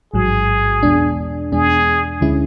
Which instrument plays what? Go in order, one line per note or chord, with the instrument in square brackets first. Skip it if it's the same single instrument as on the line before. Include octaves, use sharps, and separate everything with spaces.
[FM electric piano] A1 G#2 F#3 [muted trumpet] G#4
[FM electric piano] E2 B2 G#3 D4
[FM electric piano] E2 B2 G#3 D4 [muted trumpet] G#4
[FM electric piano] D2 D3 G#3 C#4 E4